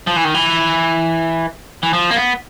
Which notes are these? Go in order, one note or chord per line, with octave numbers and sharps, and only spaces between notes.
F3
E3
D#3
E3
E3
F3
A#3
B3